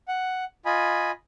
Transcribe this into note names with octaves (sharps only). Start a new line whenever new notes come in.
F#5
F4 D#5 G#5 B5